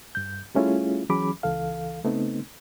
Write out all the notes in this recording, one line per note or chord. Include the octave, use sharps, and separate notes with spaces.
G2 G6
G3 A3 C#4 E4 F4 G#4
E3 F#3 C#4 G#4 B5 D6
C#2 E3 A4 F5
C#3 A3 B3 C4 D#4